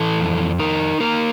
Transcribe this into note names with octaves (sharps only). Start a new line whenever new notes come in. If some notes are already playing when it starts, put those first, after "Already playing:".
Already playing: E3 A4
F2
D#4 A#4
A#3 A#4